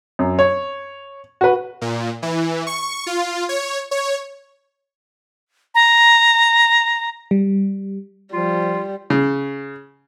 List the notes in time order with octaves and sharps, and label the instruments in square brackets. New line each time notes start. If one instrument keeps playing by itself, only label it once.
[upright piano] F#2
C#5
F#4 B4
[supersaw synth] A#2
E3
C#6
F4
C#5
C#5
[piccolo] A#5
[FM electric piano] G3
[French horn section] F3 [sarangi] G3 [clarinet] F4
[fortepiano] C#3